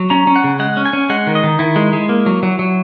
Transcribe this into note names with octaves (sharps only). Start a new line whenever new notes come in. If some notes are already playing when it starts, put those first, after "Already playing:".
Already playing: F#3
C#4 A#5
C#4
F#5
C#3
G#3 F#5
C#4
G#5
C#4
G#3 F#5
D#3
D#5
D#3
D#3 E4
G#3
G#3
A#3
F#3
F#3
F#3